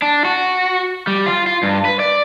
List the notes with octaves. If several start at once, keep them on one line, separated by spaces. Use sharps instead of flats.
D4
F#4
G3
F4
F4
G2
B4
D5